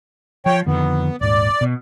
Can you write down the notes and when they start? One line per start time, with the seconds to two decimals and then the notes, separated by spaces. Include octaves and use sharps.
0.46 F3 C#5 G5
0.66 F2 D3 D#3 B3
1.21 D#1 G#2 D5
1.61 B2